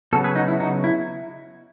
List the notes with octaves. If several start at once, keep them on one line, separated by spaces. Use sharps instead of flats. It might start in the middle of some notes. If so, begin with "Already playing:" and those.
C#3 F#3 B3 F#4 A4
G#4 B4
D#4 F#4
E4
D#4 F#4
E4